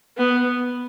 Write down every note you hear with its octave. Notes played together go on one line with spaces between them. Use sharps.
B3